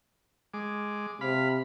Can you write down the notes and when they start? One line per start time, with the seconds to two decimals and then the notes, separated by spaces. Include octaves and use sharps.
0.54 G#3 D6
1.21 C3 F5 B5